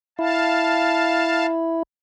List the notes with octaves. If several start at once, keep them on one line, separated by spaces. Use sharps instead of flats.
E4 F5 A5